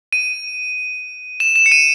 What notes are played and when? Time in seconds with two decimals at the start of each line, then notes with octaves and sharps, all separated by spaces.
0.13 D#7
1.40 E7
1.56 E7
1.66 C#7
1.72 D#7